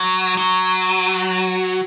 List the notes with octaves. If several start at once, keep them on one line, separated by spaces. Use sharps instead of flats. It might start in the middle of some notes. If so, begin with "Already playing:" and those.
Already playing: F#3
F#3